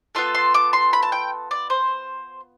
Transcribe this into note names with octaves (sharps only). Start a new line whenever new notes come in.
B3 F4 A4 C6
C6
D6
C6
B5
A5
G5
D5
C5